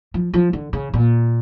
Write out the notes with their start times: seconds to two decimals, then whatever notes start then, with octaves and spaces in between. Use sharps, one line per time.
0.14 F3
0.34 F3
0.53 D3
0.73 C#3
0.94 A#2